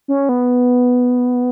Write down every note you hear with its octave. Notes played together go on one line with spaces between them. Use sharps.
C#4
B3